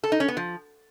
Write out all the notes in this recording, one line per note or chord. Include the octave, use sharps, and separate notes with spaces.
A4
D#4
C#4
B3
F3